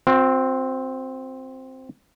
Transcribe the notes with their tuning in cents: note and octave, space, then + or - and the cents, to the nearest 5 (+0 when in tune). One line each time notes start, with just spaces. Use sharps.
C4 +0 F#4 -45